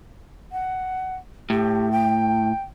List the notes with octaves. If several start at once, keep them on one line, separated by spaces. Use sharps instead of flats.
F#5
A2 G4
G5